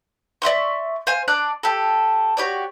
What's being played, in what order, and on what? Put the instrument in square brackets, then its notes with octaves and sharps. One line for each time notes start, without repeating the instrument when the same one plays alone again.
[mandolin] D5 E5 C6 C#6
C5 F5 G#5
D4 D5 F#6
G4 A4
F#4 G4 C#5 D5